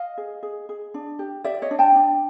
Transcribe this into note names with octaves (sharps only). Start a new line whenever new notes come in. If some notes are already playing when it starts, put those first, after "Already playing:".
Already playing: D#5 F5
G#4
G#4
G#4
D4
G4
G4 D5 E5
C#5 D#5
D4
G5 A5
D4